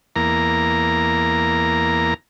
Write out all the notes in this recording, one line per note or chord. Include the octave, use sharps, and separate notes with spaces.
E2 A#3 A#5